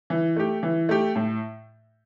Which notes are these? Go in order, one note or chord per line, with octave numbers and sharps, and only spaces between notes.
E3
A3 G4
E3
A3 G4
A2